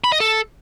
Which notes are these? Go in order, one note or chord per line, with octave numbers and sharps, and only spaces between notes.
B5
D#5
A4